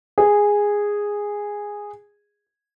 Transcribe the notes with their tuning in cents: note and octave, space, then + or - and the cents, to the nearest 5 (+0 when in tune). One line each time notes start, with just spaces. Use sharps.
G#4 -10